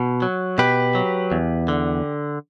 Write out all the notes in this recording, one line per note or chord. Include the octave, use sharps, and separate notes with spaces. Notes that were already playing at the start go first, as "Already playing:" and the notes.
Already playing: B2
F#3
B2 G4 B4
F#3
E2
D3